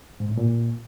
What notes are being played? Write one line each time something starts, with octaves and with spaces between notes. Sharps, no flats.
G#2
A2
A#2